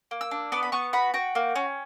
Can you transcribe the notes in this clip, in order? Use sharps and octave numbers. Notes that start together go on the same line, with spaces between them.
A#3
E6
D4
B3 D6
B5
B3 C#6
F#4 B5
F#4 G5
A#3
C#4